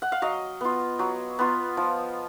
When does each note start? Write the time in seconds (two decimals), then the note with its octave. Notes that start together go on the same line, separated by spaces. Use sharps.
0.02 F#5
0.12 F5
0.22 F#3 D#5
0.61 B3 F4
0.99 F#3
1.39 B3 F4
1.77 F3